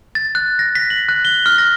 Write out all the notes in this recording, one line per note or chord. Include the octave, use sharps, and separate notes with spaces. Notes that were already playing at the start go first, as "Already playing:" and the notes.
A6
F#6
A#6
B6
F#7
F#6
G7
F6
A#6